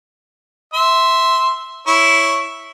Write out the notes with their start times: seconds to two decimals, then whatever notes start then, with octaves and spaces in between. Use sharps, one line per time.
0.74 E5 C6
1.87 E4 C#5